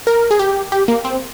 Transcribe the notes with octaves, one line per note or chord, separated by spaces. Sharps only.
A#4
G#4
G4
G4
A#3
C4